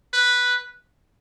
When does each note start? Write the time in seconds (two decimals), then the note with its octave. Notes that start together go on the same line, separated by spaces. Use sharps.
0.13 B4